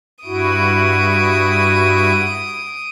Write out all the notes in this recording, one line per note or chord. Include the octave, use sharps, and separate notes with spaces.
G2 E4 F#4 D#6 D7